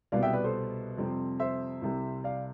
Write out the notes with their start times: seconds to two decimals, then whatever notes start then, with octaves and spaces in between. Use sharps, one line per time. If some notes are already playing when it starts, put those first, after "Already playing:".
0.12 C2 B2 G3 B3 D5 F5
0.23 E5 G5
0.33 B4 D5
0.44 A4 C5
0.98 F2 C3 G3 C4
1.40 C5 E5
1.82 C2 C3 G3
2.24 D5 F5